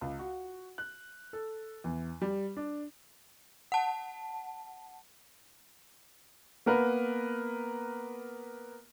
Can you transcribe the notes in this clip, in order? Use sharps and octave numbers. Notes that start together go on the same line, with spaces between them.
C#2
F#4
F#6
A4
E2
G3
D4
F#5 A5
A#3 B3 A#4 B4